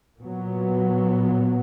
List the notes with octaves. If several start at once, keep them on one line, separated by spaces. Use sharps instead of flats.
A#2 F#3 B3